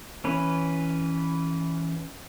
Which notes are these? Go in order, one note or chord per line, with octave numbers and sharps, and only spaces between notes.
E3 C#4 B4